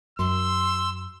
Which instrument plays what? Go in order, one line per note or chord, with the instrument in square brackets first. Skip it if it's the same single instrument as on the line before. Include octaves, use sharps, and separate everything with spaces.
[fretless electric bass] F#2 [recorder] C6 [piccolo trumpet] E6